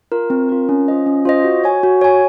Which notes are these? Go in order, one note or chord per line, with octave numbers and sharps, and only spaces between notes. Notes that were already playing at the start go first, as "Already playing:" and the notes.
F4 A#4
C4
F4 A#4
C#4
F4 C5 D#5
C#4
F4 C5 D#5
F#4
C#5 G#5
F#4
C#5 G#5